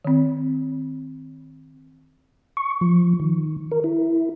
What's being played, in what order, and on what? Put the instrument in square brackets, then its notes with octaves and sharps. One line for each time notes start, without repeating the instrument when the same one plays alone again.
[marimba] D#3 C4
[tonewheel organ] C#6
F3
D#3
A#4
E4